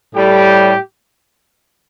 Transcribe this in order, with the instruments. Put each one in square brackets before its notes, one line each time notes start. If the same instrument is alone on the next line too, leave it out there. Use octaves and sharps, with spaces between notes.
[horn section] A2 G3 G4